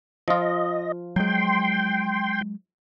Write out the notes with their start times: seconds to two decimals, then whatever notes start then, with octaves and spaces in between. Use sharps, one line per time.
0.28 F3 F4 D#5
1.16 F#3 G#3 G5 C6